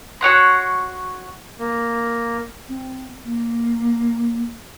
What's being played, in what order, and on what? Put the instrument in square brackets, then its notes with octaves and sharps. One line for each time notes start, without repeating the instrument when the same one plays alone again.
[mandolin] F#4 C#5 F#5 C6
[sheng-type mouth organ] A#3
[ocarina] C4
A#3